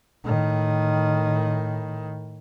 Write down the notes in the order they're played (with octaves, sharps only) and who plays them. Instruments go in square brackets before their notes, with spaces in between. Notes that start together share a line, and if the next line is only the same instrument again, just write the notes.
[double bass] A2 D#3